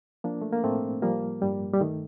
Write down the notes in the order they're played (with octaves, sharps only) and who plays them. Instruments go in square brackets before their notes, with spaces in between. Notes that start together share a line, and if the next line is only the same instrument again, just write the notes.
[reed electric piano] F3 A#3 D4
A3
A#3
A2 A3 C4
F3 G3 A#3
G2 G3
G3
D#3 A3